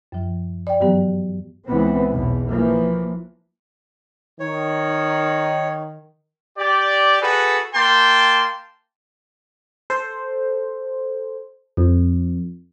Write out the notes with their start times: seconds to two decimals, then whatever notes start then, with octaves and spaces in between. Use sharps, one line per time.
0.12 F#2 F3
0.67 D5 G5
0.80 G2 E3 F#3 B3 G4
1.66 C#2 E3 B3 C4
2.11 B1 E2 B2
2.48 E3 F3 A#3
4.40 D#3 C#5
6.58 G4 D5
7.21 F#4 G#4 A4 B4
7.74 A#3 G5 A5 C6
9.90 A4 C5
11.77 F2